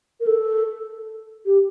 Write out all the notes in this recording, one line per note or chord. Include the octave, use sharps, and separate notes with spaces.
A#4
A4
G4